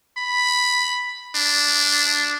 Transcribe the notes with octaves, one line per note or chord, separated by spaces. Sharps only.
B5
D4